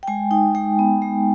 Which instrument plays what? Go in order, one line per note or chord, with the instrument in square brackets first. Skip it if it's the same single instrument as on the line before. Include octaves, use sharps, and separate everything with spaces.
[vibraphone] G5
G#3 G#5
D#4 G5
G#3 G5
B3
G#3